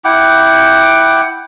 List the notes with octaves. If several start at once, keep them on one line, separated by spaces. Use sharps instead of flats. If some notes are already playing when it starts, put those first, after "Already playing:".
E4 F#5 G5 D6